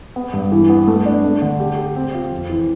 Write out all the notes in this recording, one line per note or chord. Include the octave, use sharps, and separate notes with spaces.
B3
G2
E3
B3
A3
D4
A3
D3
G4
G4
C4
F4
F2
E3